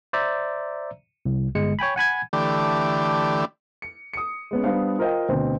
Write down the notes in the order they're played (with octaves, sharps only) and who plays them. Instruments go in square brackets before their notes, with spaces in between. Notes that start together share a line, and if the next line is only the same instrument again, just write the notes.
[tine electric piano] C5 D5 E5 A#5
C2
G1 G#3 C#7
C#5 G5 G#5 B5
F#5 G#5 B5 G#6
[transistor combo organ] D3 E3 A3 G4 D5
[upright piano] C#7
D#6 C#7
G#3 B3 C#4
G3 B3 D4 C5 F5
F4 A#4 C5 D#5 F5 G5
D2 B2 C4